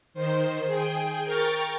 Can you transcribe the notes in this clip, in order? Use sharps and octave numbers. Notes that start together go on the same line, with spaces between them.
D#3 C5
G#4 G5
A#4 G5 C#6 F6 A6